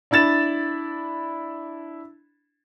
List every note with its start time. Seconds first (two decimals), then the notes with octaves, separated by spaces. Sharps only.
0.11 D4 E4 B5 A6 E7